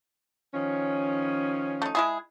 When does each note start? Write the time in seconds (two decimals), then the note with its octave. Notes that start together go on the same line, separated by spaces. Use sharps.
0.54 D#3 F3 C#4
1.82 A3 D#4
1.95 G#3 E4 G#4